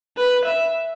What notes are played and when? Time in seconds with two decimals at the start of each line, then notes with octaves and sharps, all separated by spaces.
0.17 B4
0.45 E5